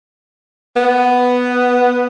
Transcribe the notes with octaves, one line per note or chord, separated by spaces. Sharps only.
B3